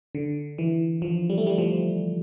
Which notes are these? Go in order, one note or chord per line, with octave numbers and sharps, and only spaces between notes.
D3
E3
F3
G3
A3
G3
F3